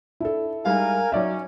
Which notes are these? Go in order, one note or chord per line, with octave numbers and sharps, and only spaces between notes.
D4 E4 A4
G3 G#3 D#4 A#4 F5 G#5
F#3 C#4 D#4 C#5 D5 E5